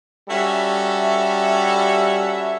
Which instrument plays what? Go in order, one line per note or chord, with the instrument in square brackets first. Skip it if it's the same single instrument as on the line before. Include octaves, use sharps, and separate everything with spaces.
[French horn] G3 [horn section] C#4 F#4 A4 [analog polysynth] E5